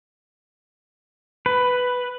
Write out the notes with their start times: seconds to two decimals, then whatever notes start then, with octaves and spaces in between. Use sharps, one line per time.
1.46 B4